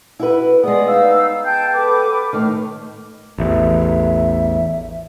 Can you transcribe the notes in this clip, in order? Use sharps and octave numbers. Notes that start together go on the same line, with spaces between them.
E4 F#4 B4
G#3 B3 G#4 D5 D#6
D#4 F5 E6
G5 A5 G6
A4 B4 D6
A2 D#3 F6
A1 E2 E5